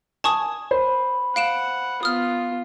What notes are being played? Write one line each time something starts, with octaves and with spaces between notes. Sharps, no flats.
G#5 A5 C#6 D#6
C5 B5
F5 F#5 D7 E7
B3 F4 D#6 F6